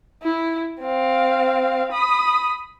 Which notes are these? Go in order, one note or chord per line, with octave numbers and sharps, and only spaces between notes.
E4
C4 F5
B5 D#6